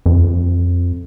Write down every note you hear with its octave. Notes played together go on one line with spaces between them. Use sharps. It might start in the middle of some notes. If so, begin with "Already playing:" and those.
F2